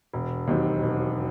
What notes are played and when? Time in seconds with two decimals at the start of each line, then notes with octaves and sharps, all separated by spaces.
0.14 E1
0.48 D#2 D#3 F#3 C4
0.83 E1